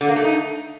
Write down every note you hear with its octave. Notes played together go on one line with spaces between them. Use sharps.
D3
A#3
A3
D#4